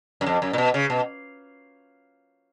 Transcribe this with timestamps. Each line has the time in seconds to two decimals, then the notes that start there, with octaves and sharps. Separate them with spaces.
0.21 F#2
0.26 F2
0.42 F#2
0.53 A#2
0.58 B2
0.74 C#3
0.90 B2